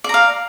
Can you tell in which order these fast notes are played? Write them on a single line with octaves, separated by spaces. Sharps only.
D5 A#5 F5